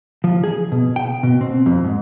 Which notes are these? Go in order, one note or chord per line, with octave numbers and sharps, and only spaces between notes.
F3
G#4
B2
G5
B2
C4
F2
G#2